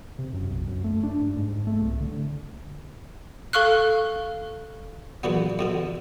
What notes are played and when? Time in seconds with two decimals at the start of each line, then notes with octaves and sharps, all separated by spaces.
0.19 C3
0.33 F#2
0.50 B1
0.68 F#2
0.84 A3
1.03 D4
1.22 G2
1.37 G#2
1.67 A3
1.82 C2
2.00 D3
3.53 A4 F5 C#6 F6 F#6
5.23 E2 A#2 D3 F#3 B3
5.59 F2 B2 D3